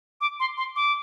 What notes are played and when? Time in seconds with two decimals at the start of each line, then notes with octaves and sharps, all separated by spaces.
0.21 D6
0.40 C6
0.57 C6
0.76 D6